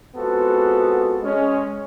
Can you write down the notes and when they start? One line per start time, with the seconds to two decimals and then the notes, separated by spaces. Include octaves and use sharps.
0.16 G#3 B3 C4 F4 F#4 A4
1.23 G#3 C#4